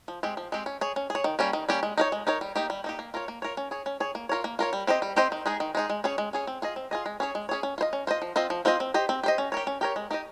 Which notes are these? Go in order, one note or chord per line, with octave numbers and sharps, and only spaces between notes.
F3
G#3 C4 G4
F3
G#3 C4 G4
C#4
G#4 C#5
C#4
G#4
C#5
D#3
G3 A#3 C#4 G4
D#3
G3 A#3 C#4 G4
G#3
D#4 A#4 C#5
G#3
D#4 A#4 C#5
G3
A#3 D#4 G4
G3
A#3 D#4 G4
A#3
F4 A#4 C#5
A#3
F4 A#4 C#5
C#4
G#4 C#5
C#4
G#4 C#5
A#3
F4 A#4 C#5
A#3
F4 A#4 C#5
G3
C4 G4 C5 D#5
G3
C4 G4 C5 D#5
D#3
G#3 D#4 G#4
D#3
G#3 D#4 G#4
G#3
C#4 G#4 C#5
G#3
C#4 G#4 C#5
C4
F4 G#4 D#5
C4
F4 G#4 D#5
G#3
C#4 G#4 C#5
G#3
C#4 G#4 C#5
C#4
F4 C5 D#5
C#4
F4 C5 D#5
F3
C4 F4 C5 D#5
F3
C4 F4 C5 D#5
C4
G4 C5 D#5
C4
G4 C5 D#5
C#4
G4 A#4 C#5
C#4
G4 A#4 C#5
G#3
D#4 G4 A#4 D#5